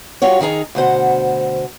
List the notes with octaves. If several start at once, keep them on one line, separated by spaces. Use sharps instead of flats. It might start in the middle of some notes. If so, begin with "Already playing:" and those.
G3 F4 F#4 C#5
F2 D#3 D#4 G#4 A#5
D2 B2 C5 F#5